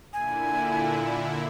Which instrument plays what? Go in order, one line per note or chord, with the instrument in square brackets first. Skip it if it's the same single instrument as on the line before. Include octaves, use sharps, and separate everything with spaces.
[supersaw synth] A#2 D3 E4 [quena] G#5